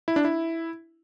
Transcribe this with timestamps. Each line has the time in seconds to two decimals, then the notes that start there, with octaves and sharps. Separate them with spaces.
0.08 E4
0.16 D4
0.25 E4